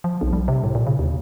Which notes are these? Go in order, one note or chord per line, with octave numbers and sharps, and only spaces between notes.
F3
B1
G3
C3
A2
A#2
C#3
D#2